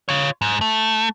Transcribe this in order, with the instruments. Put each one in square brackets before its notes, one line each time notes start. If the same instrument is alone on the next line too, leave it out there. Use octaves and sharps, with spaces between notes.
[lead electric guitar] F4 C#5
G#2
A3